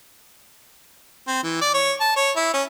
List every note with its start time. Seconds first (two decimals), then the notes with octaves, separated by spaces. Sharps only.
1.27 C4
1.43 E3
1.61 D5
1.74 C#5
2.00 A5
2.16 C#5
2.36 E4
2.54 C#4